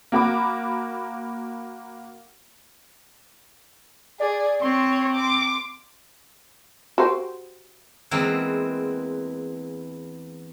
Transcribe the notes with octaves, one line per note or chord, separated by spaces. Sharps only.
A#3 F#4 B5 D6
G#4 D5
C4 C#5 C6
D6
F#4 G4 C5
E2 E3 G#3 A#3 C4